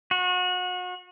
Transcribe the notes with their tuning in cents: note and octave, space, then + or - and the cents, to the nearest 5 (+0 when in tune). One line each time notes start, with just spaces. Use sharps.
F#4 -35